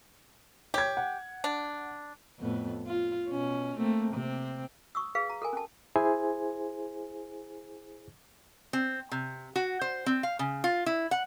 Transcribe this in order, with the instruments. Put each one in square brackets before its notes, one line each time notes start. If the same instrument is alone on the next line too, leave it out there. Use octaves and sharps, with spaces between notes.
[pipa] G4 [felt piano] C#5 G#6
[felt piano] F#5
[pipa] D4
[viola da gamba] F2 A2 B3
F4
B2 C#4
A3 A#3 C4
C3 C4
[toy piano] C#6 D#6 E6
G#4 B4 F5
A#5
A4 A#4 G#5
C#4 A5
[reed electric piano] E4 G#4 C5 G#5
[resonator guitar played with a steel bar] C4
C3
F#4
C5
C4
F5
C#3
F4
E4
F#5